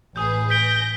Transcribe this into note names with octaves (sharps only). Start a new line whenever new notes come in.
A1 G#4 B4 D#6 G6
G#5 G6 A#6 B6 D7